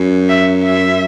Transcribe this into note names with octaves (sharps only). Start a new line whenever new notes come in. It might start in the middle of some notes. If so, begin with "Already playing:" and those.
Already playing: F#2
E5
E5